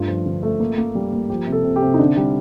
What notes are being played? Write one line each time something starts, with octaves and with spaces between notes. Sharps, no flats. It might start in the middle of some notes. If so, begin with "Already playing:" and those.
Already playing: G2 A3 F4
F3
D3
A3
A#3
A#3
G3
A#3
F3 G4
C3
A4
C3
G4
C3
D#4
D3 D4
G3